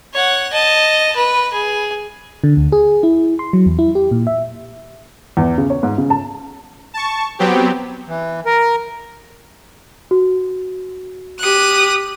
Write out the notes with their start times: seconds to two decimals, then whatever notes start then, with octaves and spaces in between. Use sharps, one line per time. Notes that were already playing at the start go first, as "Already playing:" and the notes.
0.13 C#5 F#5
0.53 D#5 A5
1.16 B4
1.53 G#4
2.44 D3
2.57 D2
2.72 G#4
3.03 E4
3.39 C6
3.53 F#3
3.66 E2
3.79 E4
3.95 G4
4.11 A#2
4.27 E5
5.37 E2
5.58 C#3
5.70 C#5
5.83 G#2
5.98 C#3
6.10 A5
6.94 A5 C#6
7.39 F#3 B3 C4 G4
8.07 E3
8.46 A#4
10.11 F#4
11.39 G4 D#6 F#6